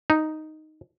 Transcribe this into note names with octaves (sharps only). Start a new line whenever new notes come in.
D#4